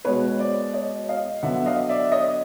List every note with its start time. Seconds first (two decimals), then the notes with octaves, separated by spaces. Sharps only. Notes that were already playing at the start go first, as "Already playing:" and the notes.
0.05 B2 G#3 B3 B4 C#5
0.39 C5 D5
0.73 C#5 D#5
1.08 D#5 F5
1.43 D3 F#3 B3 E5 F#5
1.66 D#5 F5
1.89 D5 E5
2.12 C#5 D#5